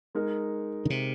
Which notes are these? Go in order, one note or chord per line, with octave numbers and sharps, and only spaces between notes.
G#3 D#4 A#4
D3
C3